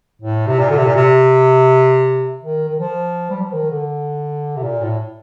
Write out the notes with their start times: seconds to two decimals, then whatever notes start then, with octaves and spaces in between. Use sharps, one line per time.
0.22 A2
0.47 C3
0.59 A#2
0.70 D3
0.77 C3
0.87 A#2
0.96 C3
2.43 D#3
2.69 D#3
2.79 F3
3.30 G3
3.41 F3
3.53 D#3
3.71 D3
4.57 C3
4.64 A#2
4.82 A2